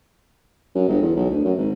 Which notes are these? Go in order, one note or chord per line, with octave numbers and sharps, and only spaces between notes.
F#2
G1
E2
B1
D2
F#2
G#1